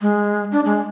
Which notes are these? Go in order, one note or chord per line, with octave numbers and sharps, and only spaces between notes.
G#3
D4
G#3